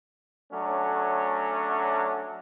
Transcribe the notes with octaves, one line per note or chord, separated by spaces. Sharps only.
F#3 A3 C#4 D4